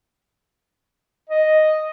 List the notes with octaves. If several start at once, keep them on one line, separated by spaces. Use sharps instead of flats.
D#5